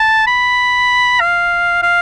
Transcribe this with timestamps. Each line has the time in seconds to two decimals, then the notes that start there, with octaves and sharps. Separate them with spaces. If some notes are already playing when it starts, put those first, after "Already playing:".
Already playing: A5
0.27 B5
1.20 F5
1.83 F5